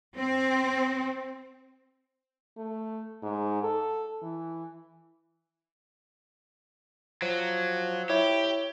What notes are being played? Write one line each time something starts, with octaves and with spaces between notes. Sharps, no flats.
C4
A3
G#2
A4
E3
F3 F#3
E4 G4 C#5